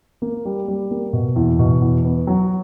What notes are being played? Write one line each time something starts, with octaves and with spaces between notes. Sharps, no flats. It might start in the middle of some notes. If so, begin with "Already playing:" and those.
A#3
G3
G3
A#3
B2
E2
B2
E2
B3
F#3